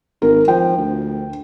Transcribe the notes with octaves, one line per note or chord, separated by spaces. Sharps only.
G#1 A#4
F3 G5
D2